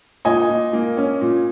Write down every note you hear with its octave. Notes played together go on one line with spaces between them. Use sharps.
A#2 D#5 G#5
A#2
A#3
C#4
A#2